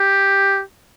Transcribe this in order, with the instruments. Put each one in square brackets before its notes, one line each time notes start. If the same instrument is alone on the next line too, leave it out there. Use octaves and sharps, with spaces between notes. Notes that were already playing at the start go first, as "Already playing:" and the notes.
Already playing: [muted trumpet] G4